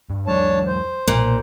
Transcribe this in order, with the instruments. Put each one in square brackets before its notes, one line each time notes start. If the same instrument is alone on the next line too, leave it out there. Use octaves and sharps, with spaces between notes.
[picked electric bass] G2
[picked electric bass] E2 F#3 G#3 [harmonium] D4 C#5 A5
[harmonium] C5
[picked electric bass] B1 [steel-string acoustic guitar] A#2